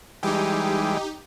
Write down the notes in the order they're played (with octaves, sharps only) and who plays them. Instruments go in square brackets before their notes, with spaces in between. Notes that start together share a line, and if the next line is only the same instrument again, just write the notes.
[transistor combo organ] E3 G3 G#3 [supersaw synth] D#4 G4